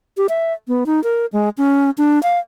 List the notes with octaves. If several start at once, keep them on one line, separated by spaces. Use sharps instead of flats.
G4
E5
B3
D#4
A#4
G#3
C#4
D4
F5